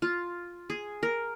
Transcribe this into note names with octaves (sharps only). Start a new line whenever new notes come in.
F4
G#4
A#4